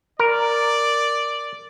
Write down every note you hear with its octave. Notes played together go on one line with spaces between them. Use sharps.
A#4 D5